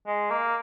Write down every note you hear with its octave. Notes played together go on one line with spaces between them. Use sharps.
G#3
A#3